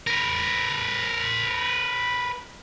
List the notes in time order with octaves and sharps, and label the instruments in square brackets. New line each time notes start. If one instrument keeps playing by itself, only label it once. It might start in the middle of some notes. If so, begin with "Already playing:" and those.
[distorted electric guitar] A#4 B4